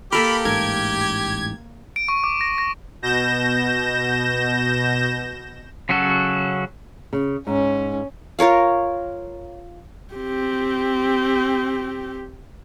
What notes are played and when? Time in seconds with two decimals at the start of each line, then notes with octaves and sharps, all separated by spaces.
0.12 A#3 G4 A4 A#4 B5
0.45 A1 G#2 A#4 G#6
1.96 D7
2.08 C#6
2.24 D6
2.41 A#6
2.58 A#6
3.02 B2 G6 A#6 E7
5.89 C#3 F#3 C#4 F#4 A4
7.13 C#3
7.47 G#2 C#4
8.39 F4 A#4 C#5 F5
10.14 C4 G4